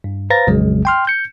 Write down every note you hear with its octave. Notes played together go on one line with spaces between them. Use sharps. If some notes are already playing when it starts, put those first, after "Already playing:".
G2
B4 C5 F5 A#5 A6 A#6
A#1 F2 C#3 F#3 G#3
G5 C6 F6
G6 C#7